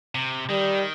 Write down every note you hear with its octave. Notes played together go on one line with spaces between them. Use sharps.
C3
D#3 G3